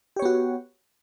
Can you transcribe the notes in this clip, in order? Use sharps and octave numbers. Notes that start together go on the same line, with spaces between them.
B3 F#4 G4 C#5